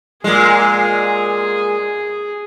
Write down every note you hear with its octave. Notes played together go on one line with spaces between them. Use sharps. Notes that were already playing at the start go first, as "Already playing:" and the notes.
A#2 G#3 G#4